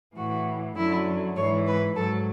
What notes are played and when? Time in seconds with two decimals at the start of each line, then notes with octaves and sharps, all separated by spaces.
0.16 A2 E3 F#4
0.76 F#2 D3 F#3 E4
1.37 G#2 E3 C#5
1.66 B4
1.95 G#2 F#3 A4